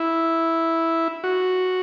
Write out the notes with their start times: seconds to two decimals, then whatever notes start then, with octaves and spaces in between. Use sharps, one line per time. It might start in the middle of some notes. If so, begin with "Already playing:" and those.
Already playing: E4
1.24 F#4